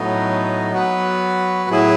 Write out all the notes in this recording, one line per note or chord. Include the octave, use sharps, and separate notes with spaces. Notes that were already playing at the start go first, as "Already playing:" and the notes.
Already playing: A2 F#3 B3 D#4
F#3 B3 F#4 B4
A2 F#3 B3 E4 G#4